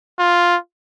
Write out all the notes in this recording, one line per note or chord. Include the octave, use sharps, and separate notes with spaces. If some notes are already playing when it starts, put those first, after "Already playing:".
F4